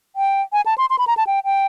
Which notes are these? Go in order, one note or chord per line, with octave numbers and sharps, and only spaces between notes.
G5
G#5
A5
C6
C6
B5
A#5
A5
G5
G5